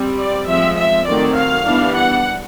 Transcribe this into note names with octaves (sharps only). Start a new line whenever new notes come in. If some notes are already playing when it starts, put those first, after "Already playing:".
Already playing: G3 C4
D5
F3 G#3 C4 E5
E5
D#3 F#3 A3 C4 D5
F5
E3 G3 B3 D4
F#5